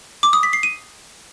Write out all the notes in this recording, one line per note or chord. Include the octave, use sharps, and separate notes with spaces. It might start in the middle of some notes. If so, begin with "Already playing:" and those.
D6
D#6
B6
C7
D#7